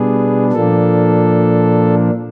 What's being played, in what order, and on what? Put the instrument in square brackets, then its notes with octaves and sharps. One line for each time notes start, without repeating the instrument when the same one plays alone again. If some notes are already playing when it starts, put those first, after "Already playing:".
Already playing: [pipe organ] B2 G3 B3 D4 G#4
A#2 F3 A#3 D4 A4